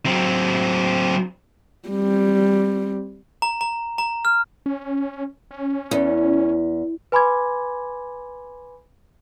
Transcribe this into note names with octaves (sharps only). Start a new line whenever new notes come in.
F#3 C4
G3 C4
A#5
A#5
A#5
F6
C#4
C#4
E2
B4 G#5 B5 C6 D6 G#6